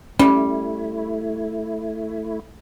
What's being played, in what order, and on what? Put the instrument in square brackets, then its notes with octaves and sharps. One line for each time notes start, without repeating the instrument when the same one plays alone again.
[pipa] G3 [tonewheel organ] A3 E4 [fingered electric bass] C#4